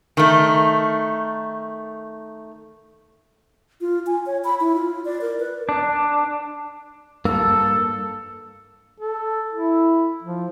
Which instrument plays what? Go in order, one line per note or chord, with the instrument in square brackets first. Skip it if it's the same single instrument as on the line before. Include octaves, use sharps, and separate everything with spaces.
[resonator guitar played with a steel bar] D#3 A3
[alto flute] F4
G#5
C#5
B5
E4
F4
D5
A#4
B4
[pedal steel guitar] D4
[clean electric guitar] G2 A#3 [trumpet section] A4 [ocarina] E6
[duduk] A4
E4
F3